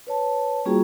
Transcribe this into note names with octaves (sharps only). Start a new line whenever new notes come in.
B4 C#5 A5
G3 A#3 C#4 F4 F#4 G#4